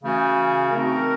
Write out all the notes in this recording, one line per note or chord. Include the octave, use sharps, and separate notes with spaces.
C#3 E3 A3 C#4 F#4
A3 C4 D#4 F#4 A#4